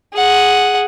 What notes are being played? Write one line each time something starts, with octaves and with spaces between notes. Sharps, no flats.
G#4 F#5